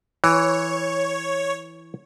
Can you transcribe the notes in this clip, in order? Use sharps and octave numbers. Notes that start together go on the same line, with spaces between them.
E3 C#5